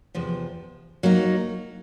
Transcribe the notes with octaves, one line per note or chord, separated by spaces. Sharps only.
E2 C3 F3
F#3 A#3 D#4